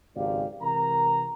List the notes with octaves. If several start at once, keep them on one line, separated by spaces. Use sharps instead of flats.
G#1 C#2 F#2 G4 D5 F5
C3 E3 G#3 A#4 A#5